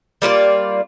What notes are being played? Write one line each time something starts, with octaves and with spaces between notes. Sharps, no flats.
G3 A#3 F4 D5